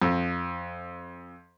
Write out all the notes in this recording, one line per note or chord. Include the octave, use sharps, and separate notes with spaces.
F2